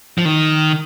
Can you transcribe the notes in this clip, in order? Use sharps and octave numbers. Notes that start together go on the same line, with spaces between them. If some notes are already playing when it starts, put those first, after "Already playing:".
F3
D#3